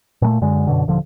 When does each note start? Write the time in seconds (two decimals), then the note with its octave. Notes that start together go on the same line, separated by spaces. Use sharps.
0.22 A#2 G#3 A3
0.41 F#2 D3 G#3
0.67 F#2 B2 D3
0.88 D#1 D3 F3